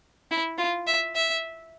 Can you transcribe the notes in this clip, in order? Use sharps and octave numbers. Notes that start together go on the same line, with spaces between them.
E4
F4
E5
E5